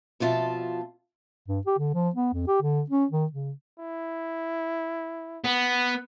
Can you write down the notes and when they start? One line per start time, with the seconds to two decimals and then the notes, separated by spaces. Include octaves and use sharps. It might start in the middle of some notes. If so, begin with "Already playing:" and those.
0.20 F2 B2 F4 E5 A5
1.48 G2
1.67 G4
1.79 D3
1.94 F3
2.16 B3
2.34 F2
2.48 G4
2.62 D3
2.90 C#4
3.11 D#3
3.33 C#3
3.79 E4
5.44 B3